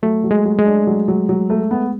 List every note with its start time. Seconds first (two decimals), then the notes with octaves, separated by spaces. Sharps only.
0.02 F#3 A3
0.24 F#3
0.31 G#3
0.45 F#3
0.58 G#3
0.65 D4
0.87 F#3
1.08 F#3
1.29 F#3
1.50 A3
1.71 B3